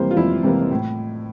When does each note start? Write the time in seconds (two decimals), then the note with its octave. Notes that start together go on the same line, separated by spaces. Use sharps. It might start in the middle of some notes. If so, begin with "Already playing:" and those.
Already playing: F2 C3 E3 G3 A#3 C5
0.11 F4
0.17 F2 E4
0.43 C3 E3 G3 A#3
0.71 A2